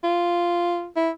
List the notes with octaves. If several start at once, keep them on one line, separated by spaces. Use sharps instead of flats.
F4
E4